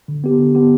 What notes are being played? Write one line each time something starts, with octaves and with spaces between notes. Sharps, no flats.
D3
B3 G4
D3
B3 G4